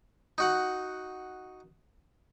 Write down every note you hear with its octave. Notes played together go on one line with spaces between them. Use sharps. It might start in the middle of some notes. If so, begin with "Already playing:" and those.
D#4 F#4 F#5